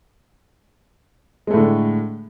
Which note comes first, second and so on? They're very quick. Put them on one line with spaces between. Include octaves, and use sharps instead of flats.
G#3 A3 A2 D3